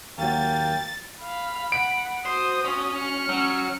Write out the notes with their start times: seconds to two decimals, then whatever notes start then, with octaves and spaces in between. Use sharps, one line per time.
0.18 D#2 F#3 A#3 G5 A6
1.23 F5 B5
1.72 F#5 D7
2.26 F#4 C5 D#6
2.65 C#4
2.97 F6 C#7
3.29 F#3 C#4